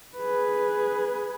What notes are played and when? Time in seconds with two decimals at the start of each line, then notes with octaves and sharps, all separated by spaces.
0.17 G#4 B4